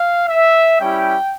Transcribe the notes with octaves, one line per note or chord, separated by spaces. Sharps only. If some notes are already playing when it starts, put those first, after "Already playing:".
Already playing: F5
E5
G3 C#4 E4 G4 G5